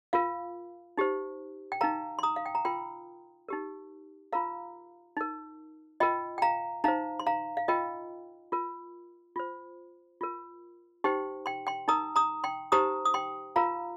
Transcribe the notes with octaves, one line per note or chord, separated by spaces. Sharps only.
F4 A#4 F5
D#4 G4 C5
G5
D#4 A#4 F5 A#5
C6
A#5 D#6
F5
G5
A#5
F4 A#4 G5 C6
D#4 G4 A#4
F4 A#4 F5 A#5
D#4 A#4
F4 A#4 D#5 G5
G5
F5 A#5
D#4 C5 F5 A#5
C6
F5 A#5
F5
F4 A#4 D#5 G5
F4 A#4
F4 C5
F4 A#4
D#4 G4 C5 G5 C6
G5 C6
G5 C6
D#4 A#4 A#5 D#6
A#5 D#6
G5 C6
D#4 G4 C5 A#5 D#6
D#6
G5 C6
F4 A#4 F5 A#5